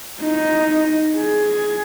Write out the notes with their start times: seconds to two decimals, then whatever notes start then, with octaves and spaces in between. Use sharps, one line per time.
0.23 D#4
1.17 G#4